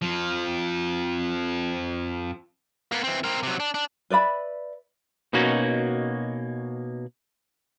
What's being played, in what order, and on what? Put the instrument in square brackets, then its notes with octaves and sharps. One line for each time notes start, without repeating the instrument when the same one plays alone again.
[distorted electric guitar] F2 F3
A#3 B3
E3 C4
C4 A#4
C3 F#3
D4
D4
[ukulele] B4 D5 E5 B5
[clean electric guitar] B2 A#3 C#4 D#4 F#4